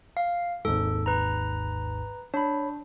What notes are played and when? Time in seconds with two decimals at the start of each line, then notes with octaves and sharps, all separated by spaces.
0.17 F5
0.65 G#1 D#2 G#2 A4
1.06 B4 A#5
2.34 D4 C#5 B5